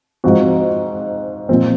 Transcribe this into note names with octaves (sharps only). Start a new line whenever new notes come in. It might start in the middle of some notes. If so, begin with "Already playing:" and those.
G#2 F3 C4 F#4
A#2 F3 C4